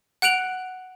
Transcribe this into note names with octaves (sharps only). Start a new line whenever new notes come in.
F#5 F#6 D7 F7 F#7